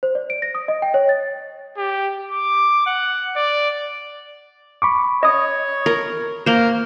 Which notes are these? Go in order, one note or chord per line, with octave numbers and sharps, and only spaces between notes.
C5
D5
D7
A#6
D#6
D#5
G5
C#5
A6
G4
D6
F#5
D5
B5 C#6 D6
C#5 D#5 D#6
A#4
A#3 A#4 C5